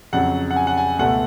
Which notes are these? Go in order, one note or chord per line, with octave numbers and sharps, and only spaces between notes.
F2 C#3 F#3 F#5
F#5
G#5
F#5
G#5
C#2 B2 A3 F#5